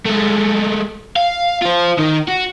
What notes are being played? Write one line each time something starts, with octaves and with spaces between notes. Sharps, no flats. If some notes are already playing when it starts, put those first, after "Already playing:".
G#3 A3
F5
F4 C5
D#3 D#4
F#4